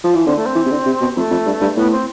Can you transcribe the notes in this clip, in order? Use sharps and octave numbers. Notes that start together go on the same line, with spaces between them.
F3
E3
D3 C4
A3
C4
E3
C3
D3
C3
B2
F2 A3
F2
G2
G2
A2 B3
C4